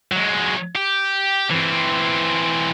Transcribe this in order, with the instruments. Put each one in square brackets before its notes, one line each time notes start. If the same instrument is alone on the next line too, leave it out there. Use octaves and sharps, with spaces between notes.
[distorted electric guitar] F#3 G#3
G4
E3 C4